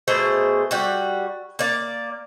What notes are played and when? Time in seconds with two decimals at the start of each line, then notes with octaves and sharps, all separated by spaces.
0.08 B2 A3 G#4 C5
0.71 G3 F#4
1.59 A#3 D5